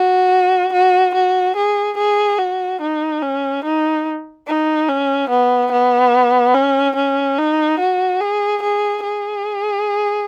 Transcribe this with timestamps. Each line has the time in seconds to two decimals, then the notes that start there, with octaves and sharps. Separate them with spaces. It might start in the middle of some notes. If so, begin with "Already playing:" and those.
Already playing: F#4
0.73 F#4
1.14 F#4
1.56 G#4
1.97 G#4
2.39 F#4
2.81 D#4
3.22 C#4
3.64 D#4
4.47 D#4
4.89 C#4
5.30 B3
5.72 B3
6.54 C#4
6.96 C#4
7.38 D#4
7.79 F#4
8.20 G#4
8.62 G#4
9.04 G#4